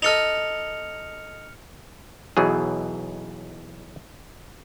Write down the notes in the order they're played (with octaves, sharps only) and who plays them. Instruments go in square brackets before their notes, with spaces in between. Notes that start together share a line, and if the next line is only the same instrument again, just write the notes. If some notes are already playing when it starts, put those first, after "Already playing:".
[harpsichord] D#4 A4 D#5 [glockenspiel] F6 C#7 F7
[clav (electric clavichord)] B1 B2 E3 F#3 G#4